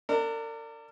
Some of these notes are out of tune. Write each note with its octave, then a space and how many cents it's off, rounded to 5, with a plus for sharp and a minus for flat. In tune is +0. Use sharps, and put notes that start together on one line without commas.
D4 +0 A#4 -40